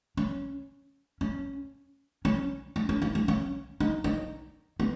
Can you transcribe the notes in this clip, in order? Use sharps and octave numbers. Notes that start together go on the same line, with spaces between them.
C#4
C#4
C#4
C#4
C#4
D#4
C#4
C#4
D#4
D#4
B3